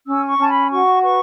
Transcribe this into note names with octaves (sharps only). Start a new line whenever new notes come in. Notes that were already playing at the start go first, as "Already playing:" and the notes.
C#4 E6
C#6
C#4 A5
B5
F#4 C#6
B4 C#6